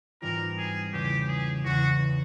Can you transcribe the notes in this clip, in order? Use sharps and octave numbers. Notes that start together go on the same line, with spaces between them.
G#2 E3 G3 C4 F4 A#4
G#4
E2 C#3 E3 G4
G#4
E2 C#3 E3 F#4